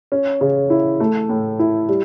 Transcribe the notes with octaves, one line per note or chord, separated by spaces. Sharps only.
C#4
C#3
E4
A3
A2
E4
G3